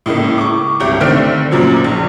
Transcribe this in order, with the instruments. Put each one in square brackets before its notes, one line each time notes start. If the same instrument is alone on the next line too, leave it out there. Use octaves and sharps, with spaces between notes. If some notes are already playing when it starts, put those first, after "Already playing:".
[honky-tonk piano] A2 C#3 G#3 A#3
C#6 D6
G1 C2 G4
D3 D#3 A3 C4 F6 D7
F#2 A#2 C#3 F3 F#3
A#1